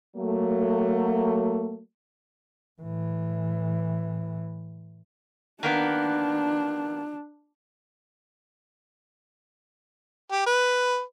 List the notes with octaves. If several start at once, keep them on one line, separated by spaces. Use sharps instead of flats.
F#3 A3 A#3
A2 E3
D#3 A#3 B3 D4
G4
B4